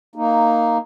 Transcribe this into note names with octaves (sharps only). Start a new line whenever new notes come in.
A#3 D#4